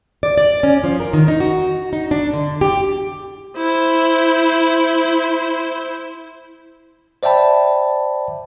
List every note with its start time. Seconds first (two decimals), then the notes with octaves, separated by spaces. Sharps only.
0.23 D5
0.38 D5
0.63 C#4
0.84 F3
1.00 A#4
1.13 D#3
1.28 D#4
1.40 F#4
1.93 D#4
2.11 D4
2.33 D3
2.61 G4
3.57 E4 C5
7.23 C5 D5 E5 G5 A5 B5